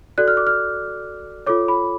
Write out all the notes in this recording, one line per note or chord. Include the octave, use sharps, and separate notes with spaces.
F#4 A4 D5 F#6
F6
D6
F6
F4 A4 C#5 D6
B5